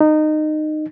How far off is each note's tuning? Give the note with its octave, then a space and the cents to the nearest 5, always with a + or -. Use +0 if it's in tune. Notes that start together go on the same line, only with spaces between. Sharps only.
D#4 -20